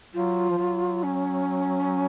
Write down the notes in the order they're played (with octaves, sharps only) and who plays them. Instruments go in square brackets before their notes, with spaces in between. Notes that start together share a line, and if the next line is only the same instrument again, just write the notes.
[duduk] F#3 [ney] F4
[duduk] F3
F#3
[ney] C#4